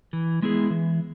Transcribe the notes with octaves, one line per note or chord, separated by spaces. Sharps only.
E3
G#3 B3 E4 G#4
E3